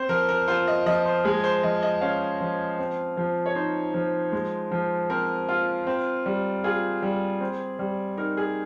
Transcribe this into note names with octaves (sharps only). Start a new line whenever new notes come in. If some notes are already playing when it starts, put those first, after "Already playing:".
Already playing: C4 C5
F3 A#4
A#4
F4 C5
D#5
F3 D#5
C5
G#3 G#4
C5
F3 D#5
D#5
C#4 F5
F3
C4
F3
C#5
D#4 C5
F3
G#3
F3
C4 A#4
F4
C4
G3
F4 G#4
G3
C4
G3
D#4 A#4
G#4